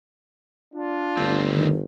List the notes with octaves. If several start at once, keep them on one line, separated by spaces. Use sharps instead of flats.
D4 F4
G1 D2 C4
D#3